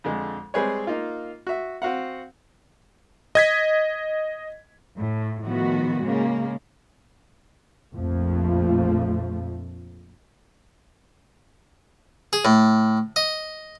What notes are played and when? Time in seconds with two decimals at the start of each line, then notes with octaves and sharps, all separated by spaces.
0.04 F2 D3 G#3
0.54 G3 G#3 C4 G#4 B4 C#5
0.87 A#3 D#4 F4
1.47 F#4 E5
1.82 C4 F#4 F5 F#5
3.35 D#5 G#6 B6
4.98 A2
5.43 A2 D#3 F3 B3 F#4
6.02 C#3 G#3 A#3
7.94 A#1 F2 F3 A3
12.33 G#4
12.45 A2
13.16 D#5